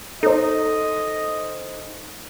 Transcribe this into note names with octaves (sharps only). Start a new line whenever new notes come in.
D#4 A4 C5 D#5